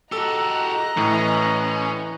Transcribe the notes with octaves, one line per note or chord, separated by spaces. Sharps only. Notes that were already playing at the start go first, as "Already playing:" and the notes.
F#4 G4 A4 D#5 A#5 E6 F#6
A2 E3 C#4